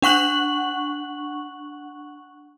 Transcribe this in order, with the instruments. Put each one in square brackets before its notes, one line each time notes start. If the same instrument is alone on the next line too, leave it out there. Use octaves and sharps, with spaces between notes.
[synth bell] D4 F#5 C#6 F#6 F#7